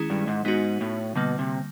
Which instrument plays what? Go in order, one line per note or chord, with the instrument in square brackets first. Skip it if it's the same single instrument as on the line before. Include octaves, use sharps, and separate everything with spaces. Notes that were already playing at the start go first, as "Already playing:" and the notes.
Already playing: [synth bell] D#3 G#3 C#4 E4 G#4
[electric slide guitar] G2
G#2
[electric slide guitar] G#2 [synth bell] B3 D#4 F#4
[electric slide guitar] A2
[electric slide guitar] B2 [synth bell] D3 G3 A#3
[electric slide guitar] C3